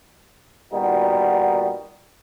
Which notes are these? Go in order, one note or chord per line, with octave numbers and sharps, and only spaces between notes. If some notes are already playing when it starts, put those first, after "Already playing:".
A#2 D#3 G3 B3 D#4 F#4